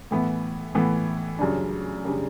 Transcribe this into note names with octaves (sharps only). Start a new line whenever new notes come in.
A2 E3 B3
A2 E3 B3
F#2 C#3 G3 D4
C#3 G3 D4